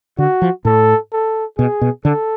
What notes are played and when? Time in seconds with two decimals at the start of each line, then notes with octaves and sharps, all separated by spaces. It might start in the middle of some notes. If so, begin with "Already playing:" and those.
0.18 D3 F#4
0.42 F3
0.65 A2 A4
1.12 A4
1.58 B2 G#4
1.81 B2
2.05 D3 A4